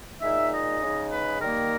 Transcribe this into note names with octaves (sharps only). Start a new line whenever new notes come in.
A#2 G#3 D#4 E5
D#5
C#3 G#3 D#4
B4
D#3 G3 A#3 A#4